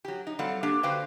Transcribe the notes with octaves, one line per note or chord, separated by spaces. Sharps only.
F#3 G4
D#4
F#3 G3 C4 A4 F5 F#5
A#3 D4 G4
D3 F#4 B4 C5 F5 G5